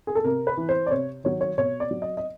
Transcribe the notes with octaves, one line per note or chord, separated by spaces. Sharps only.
G#4
A4
C3 A#4
B4
E3
C5
D5
C3 C#5
D#3 F#3 C#5
C#5
B2 C#5
D5
F#3
D#5
D#5